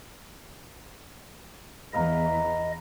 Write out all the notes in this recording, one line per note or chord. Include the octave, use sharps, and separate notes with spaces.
E2 E3 B4 D#5 F5 A#5